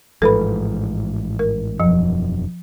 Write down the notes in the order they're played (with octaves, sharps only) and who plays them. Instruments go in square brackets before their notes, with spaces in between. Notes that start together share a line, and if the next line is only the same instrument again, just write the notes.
[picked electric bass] A1 G#2 F3 [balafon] A4 B4 B5
[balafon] A#4
[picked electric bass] E1 F#2 [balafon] F3